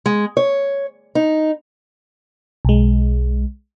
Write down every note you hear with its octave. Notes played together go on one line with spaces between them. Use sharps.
G#3
C#5
D#4
B1 G#3